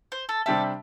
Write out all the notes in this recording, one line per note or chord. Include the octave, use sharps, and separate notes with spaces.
C5
A4
C3 G3 D4 G4 A4 E5